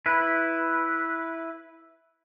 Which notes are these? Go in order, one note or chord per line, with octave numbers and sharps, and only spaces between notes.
E4 B4